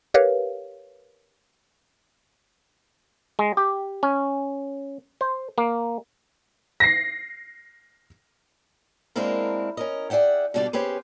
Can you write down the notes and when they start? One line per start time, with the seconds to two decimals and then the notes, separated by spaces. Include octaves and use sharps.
0.14 G4 A#4 B4 C#5 F5
3.39 G#3
3.57 G4
4.03 C#4
5.21 C5
5.58 A#3
6.80 A#6 C7
9.16 G#3 A#3 C4 D4 E4 A#4
9.77 C#4 A#4 D#5
10.10 G#4 D5 E5 F#5 G5
10.54 B2 D3 G3 D4 G4 D5
10.73 C#4 G4 G#4 B4 C5